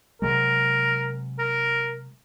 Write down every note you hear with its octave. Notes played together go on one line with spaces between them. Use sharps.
C3 F#3 G#3 A#4
A#4